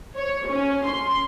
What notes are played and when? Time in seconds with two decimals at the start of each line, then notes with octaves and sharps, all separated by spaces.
0.16 C#5
0.49 C#4
0.87 C6